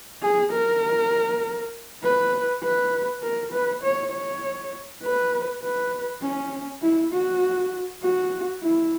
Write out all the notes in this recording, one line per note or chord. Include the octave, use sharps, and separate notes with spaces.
G#4
A#4
B4
B4
A#4
B4
C#5
C#5
B4
B4
C#4
E4
F#4
F#4
E4